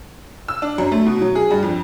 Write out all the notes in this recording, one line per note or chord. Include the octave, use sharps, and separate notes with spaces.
E6
D4
F#2
A3
B2
F#3
G#4
G2
F2